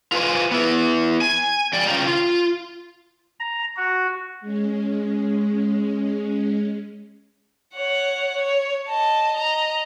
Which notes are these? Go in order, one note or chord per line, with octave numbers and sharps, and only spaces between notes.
F4 B4 C5 G#5
B3 E4
G#5
F2 D5 G5
C#3 C#4 F4 G5 A#5
F4
A#5
F#4
G#3 C#4
C#5 F#5
C#5
D#5 A5
D#5 A#5